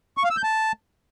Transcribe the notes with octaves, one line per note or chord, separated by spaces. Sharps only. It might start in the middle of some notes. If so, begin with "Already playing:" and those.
C#6
F5
E6
G6
A5